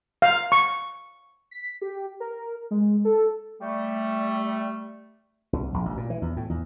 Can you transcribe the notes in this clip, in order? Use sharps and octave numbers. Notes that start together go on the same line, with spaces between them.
F5
C#6
B6
G4
A#4
G#3
A4
G3 A3
C2
A#1
A1
A#2
E3
E2
A2
E2